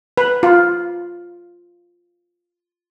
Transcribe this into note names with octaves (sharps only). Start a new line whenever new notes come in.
B4
F4